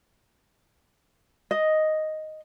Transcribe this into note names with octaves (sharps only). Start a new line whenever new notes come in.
D#5